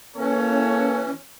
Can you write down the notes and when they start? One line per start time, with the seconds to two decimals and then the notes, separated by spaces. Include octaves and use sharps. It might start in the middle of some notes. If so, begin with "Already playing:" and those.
0.17 E3 A#3 C#4 A4 C#5